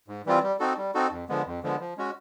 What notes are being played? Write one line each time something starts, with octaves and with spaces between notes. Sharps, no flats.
G#2
E3 G3 C4 F4
G3
C4 D#4 F#4 A4
G3
C4 D#4 F#4 A4
F2
D3 F3 G#3 B3
F2
D3 F3 G#3 B3
F3
G#3 C#4 F#4